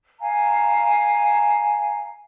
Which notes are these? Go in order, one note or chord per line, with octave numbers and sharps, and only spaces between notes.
F5 G#5 A#5